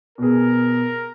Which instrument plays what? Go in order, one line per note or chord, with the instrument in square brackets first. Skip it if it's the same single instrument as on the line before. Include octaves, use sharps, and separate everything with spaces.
[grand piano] B2 B3 G#4 [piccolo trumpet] A#4